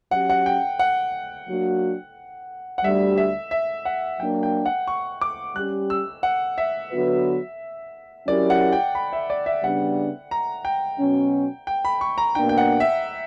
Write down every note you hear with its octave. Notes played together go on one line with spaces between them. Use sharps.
F#3 C#4 G4 F#5
F#5
G5
F#5
F#3 A#3 D4 F#4
F#5
D2 D3 G3 E5
E5
E5
F#5
F#3 A#3 D4 G5
G5
F#5
C#6
D6
G3 C#4 G4 F#6
E6
F#5
E5
D3 F#3 B3 F#4 B4
F#3 C#4 E4 G4 A#4 D5
F#5
G5
B5
E5
D5
E5
C#3 G3 B3 D4 F#5
A#5
G5
B2 F#3 C#4
G5
B5
C#6
A#5
B2 A#3 D4 G5
G5
F#5
E5